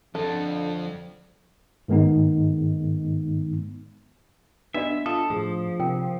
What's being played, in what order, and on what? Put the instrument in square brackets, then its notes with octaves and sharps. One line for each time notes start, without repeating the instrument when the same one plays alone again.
[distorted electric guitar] F2 [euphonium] D3 [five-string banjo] A4
[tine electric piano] G#2 D#3 G#3 B3 D#4
[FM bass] B3 [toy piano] D4 F#4 D#5 [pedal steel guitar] E5
[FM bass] F4 [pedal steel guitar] A4 [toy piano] D#6
[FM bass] A2 [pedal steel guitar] F3 [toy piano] G#4
[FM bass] C3 [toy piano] F4 A#4 G5